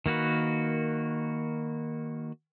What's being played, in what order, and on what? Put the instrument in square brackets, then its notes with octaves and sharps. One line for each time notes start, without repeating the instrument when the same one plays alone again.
[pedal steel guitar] D#3 A#3 F#4 B4